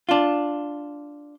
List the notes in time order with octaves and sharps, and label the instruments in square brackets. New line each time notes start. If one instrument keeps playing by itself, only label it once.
[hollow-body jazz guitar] D4 F4